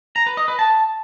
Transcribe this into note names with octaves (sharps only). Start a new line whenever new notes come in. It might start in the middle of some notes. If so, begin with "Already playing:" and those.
A#5
B4
D#5
B4
A5